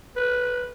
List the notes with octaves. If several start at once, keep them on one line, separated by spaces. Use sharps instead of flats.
B4